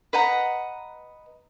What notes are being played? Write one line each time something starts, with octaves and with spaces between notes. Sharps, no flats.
B4 D#5 F#5 A#5